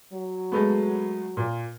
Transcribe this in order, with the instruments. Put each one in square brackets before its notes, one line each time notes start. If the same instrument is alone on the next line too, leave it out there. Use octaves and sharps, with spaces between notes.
[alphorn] F#3
[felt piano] G#3 A3 B3
A#2